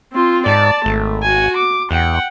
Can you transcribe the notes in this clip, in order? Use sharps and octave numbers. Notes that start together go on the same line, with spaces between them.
C4 F4
G#2 D5 A5
G#1 A3
F#4 G#5
D6
E2 F#5 G5